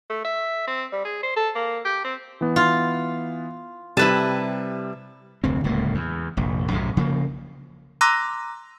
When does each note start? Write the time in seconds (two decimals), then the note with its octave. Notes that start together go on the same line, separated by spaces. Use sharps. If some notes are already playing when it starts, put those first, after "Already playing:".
0.10 A3
0.25 E5
0.68 C4
0.93 G3
1.05 G#4
1.23 C5
1.37 A4
1.55 A#3
1.85 G4
2.05 C4
2.41 E3 B3
2.56 F4
3.97 C3 G3 E4 B4 A5 D#7
5.44 F1 D2 C4
5.64 D1 C#2 A2 A#3
5.95 E2
6.37 F1 A#1
6.70 B1 F#2 A2 C3
6.97 C#3 F3 A#3
8.01 A#5 C6 D6 E6 F#6 A#6